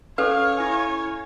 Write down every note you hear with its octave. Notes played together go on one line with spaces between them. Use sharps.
C#4 A4 B4 C#5 F5
E4 G#5